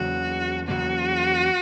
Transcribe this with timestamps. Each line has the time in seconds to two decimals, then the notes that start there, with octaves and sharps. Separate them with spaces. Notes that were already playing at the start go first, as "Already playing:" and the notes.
Already playing: E2 C#3 F#3 A#3 F#4
0.68 E2 C#3 F#3 A#3 F#4